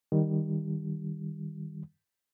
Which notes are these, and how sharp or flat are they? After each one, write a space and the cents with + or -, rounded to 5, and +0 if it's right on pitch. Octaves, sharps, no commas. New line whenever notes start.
D#3 +0 G3 +5